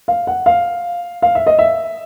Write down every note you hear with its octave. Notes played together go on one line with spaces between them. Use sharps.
F5
F#5
F5
F5
E5
D#5
E5